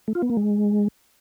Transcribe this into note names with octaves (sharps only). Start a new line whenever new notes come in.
A3
F4
B3
A#3
G#3